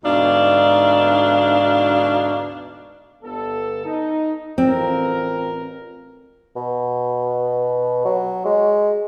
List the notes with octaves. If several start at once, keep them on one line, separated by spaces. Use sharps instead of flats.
D2 G#2 B2 D4 D#4 F5
G1 B3 A4
D#4
A1 C4 F4 A#4
B2
F#3
G#3